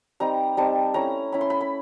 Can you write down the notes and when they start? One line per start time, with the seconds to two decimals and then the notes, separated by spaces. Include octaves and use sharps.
0.20 G3 C4 D#4 A#5
0.57 G3 C4 D#4 A5
0.94 A3 C#4 E4 A#5
1.32 A3 C#4 E4 B5
1.41 C6
1.50 B5
1.61 B5